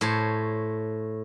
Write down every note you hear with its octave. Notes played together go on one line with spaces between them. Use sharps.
A2 C5 C#5 A5